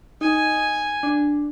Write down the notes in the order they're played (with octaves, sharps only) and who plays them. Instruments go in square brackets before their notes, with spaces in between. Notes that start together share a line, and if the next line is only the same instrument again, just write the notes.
[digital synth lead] D#4 [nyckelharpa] G#5
[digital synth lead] D4